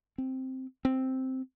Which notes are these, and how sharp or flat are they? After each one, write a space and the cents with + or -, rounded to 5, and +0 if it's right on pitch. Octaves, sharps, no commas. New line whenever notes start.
C4 +0
C4 +0